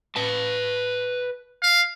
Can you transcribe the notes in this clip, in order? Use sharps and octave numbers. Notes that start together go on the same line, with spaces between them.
B4 A5
F5